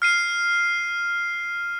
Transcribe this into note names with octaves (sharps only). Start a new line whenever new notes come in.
F6 C7 D#7